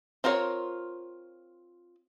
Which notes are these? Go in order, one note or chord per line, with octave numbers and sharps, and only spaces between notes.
C4 F4 A#4 C5 C#5